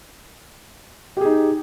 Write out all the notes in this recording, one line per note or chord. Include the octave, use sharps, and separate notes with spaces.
D#4 G4 G#4